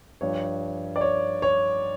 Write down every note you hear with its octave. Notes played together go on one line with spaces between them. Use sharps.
G2 F3 C#5
D5
C#5
C#5